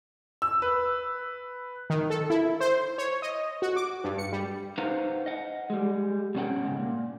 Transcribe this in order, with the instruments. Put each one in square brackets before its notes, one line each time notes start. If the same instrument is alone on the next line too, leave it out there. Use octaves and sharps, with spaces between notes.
[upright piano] E6
B4
[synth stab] D#3
A4
E4
C5
C#5
D#5
F#4
D6
G2
C#7
G3
[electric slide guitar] D#4 B4 C5 F5 F#5 A#5
D#5 F#5
G3 G#3
G2 B2 C#4 C5 F#5 G5
G#2 C#3
A#2